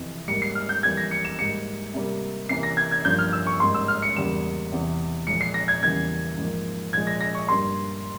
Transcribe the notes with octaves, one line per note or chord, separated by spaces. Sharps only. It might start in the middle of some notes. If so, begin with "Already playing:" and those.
Already playing: F2 C3 E3
G#2 G3 A#3 C#7
C7
F6
G6
F2 E3 G3 A#3 G#6
A#6
C#7
E7
G#2 G3 A#3 C#7
C3 G3 A#3
C3 E3 A#3 C7
A#6
G#6
G#6
G2 F3 A#3 G6
F6
E6
C#6
G#2 G3 A#3 C6
E6
F6
C#7
E2 C#3 G3 A#3 E7
E2 C3 E3
A#2 F3 G#3 C#7
C7
A#6
G#6
E2 C#3 E3 G3 A#3 G#6
G#2 F3 A#3
A#2 F3 G#3 G#6
A#6
A#6
C#6
G2 G3 A#3 C6